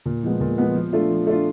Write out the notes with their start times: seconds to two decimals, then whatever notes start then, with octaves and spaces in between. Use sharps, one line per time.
0.06 A#2
0.23 F3 G#3 B3
0.40 A#2
0.58 F3 G#3 B3
0.75 F3
0.93 A3 D4 F4
1.10 F3
1.27 A3 D4 F4